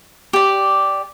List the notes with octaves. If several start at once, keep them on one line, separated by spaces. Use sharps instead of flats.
G4 D5